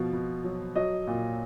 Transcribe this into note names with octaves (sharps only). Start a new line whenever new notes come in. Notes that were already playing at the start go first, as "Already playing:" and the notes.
Already playing: B2 F3
B2
F#3
F#3 D#5
A#2